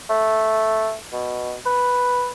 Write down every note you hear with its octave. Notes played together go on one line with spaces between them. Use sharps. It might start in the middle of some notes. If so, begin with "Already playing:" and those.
A3
B2
B4